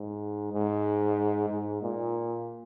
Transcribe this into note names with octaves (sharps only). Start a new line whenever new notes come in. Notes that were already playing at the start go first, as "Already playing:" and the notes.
Already playing: G#2
G#2
G#2
A#2